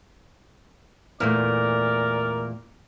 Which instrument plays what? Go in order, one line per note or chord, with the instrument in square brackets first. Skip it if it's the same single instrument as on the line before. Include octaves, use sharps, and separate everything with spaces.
[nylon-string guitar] E2 A#2 A3 [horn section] A#4 D5